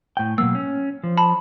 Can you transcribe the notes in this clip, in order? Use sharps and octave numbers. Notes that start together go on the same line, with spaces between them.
A2 G5
B2 F#3 A#3 E6
C#4
F3
A5 B5